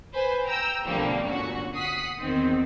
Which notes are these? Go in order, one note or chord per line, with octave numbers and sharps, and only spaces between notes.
B4 C5 G#5
G5 A#5 E6
B1 D3 F3 G3 A3 A#3
G1 A#2 D3 C#4 F#4 C#6
F#5 D#6 B6 C7
E2 D#3 C4